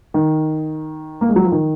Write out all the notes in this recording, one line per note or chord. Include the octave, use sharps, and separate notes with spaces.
D#3
A#3
G#3
F#3
F3
D#3